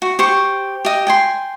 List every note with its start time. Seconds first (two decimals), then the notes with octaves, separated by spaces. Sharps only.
0.02 F#4
0.19 G4 C5 C#6
0.85 G4 D#5
1.07 G5 G#5 C6